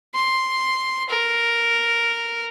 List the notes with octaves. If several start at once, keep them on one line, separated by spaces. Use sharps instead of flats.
C6
A#4